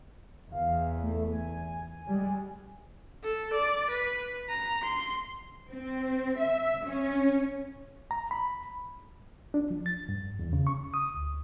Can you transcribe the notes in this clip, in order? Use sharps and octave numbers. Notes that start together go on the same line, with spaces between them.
E2 E3 F5
A3
G#5
G3 G#3
A4
D5
B4
A#5
C6
C4
E5
C#4
A#5
B5
D4
F3
A6
G2
E2
C#3
C#6
D#6
D2